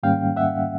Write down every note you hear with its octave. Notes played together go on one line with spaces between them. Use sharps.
G#2 D#3 G3 A#3 C#4 F5 G5
E5 F#5